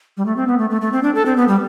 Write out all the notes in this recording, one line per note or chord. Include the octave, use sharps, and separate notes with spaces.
G3
A3
C4
B3
A3
A3
A3
C4
D4
A4
C4
B3
G3